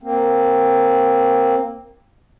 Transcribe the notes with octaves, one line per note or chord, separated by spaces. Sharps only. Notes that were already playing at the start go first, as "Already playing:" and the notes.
A#3 C4